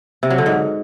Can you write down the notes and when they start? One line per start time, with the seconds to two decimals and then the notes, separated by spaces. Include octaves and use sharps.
0.23 C3
0.30 F#3
0.38 D3
0.46 G#2